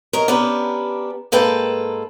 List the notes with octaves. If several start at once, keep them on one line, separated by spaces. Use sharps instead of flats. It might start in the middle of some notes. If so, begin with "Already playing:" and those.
A#4 C#5 D#5
B3 C#4 D4 G4 A#4 B4
G#2 A#3 A4 B4 G5 A5